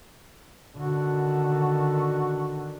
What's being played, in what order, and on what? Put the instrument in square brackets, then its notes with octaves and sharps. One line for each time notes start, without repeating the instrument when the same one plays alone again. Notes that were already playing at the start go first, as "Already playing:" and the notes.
[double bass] D3 D#3 [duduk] F#4